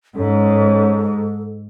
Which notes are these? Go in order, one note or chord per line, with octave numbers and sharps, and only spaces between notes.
G#2 C#4 A4